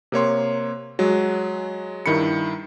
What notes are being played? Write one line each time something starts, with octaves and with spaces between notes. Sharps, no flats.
C3 A#3 C#5 C6
F#3 G#3
G2 D#3 E4 B5 C#7